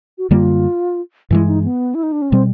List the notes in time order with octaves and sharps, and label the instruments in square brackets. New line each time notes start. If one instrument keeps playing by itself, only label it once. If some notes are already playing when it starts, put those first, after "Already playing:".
[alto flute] F#4
[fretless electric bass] F#2 D3 G3 A#3 [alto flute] F4
[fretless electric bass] G2 E3 G#3 [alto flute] E4
[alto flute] D#4
B3
E4
D#4
D4
C#4
[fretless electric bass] B2 G3 [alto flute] C4